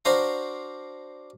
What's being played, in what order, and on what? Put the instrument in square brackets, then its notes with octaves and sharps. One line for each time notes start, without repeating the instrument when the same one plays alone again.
[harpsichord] D4 F#4 C5 F5 A#5